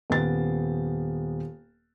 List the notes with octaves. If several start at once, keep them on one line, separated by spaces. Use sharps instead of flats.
D#1 B3 A6